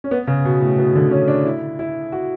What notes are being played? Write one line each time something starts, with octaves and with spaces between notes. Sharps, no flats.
C#4
B3
C#3
B2
A2
B2
D3
C#4
D4
E4
E4
F#4